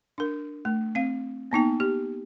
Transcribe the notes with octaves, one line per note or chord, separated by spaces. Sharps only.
D4 A#4
A3
C4 F5
A#3 B3 D#4 G5
G4